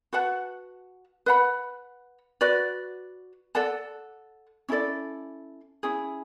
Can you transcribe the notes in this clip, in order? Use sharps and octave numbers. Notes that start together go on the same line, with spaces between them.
F#4 B4 F#5 A5
B4 F#5 B5
F#4 B4 D5
A4 D5 F#5 A5
C#4 E4 A4 D5
C#4 E4 G#4